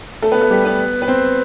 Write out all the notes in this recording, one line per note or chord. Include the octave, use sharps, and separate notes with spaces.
A3 A4
B3 B4
A3 A4
G3 G4
B3 B4
B4
C4 C5